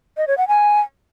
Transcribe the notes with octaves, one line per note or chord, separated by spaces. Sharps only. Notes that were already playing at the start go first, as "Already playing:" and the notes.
D#5
C#5
F#5
G#5